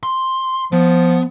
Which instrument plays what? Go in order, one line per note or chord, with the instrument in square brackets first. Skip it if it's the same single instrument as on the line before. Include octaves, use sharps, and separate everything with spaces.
[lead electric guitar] C6
[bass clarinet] F3 [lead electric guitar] B3